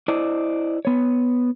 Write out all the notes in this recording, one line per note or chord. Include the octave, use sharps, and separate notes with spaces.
E4 C5 D5 D#5
B3 C#5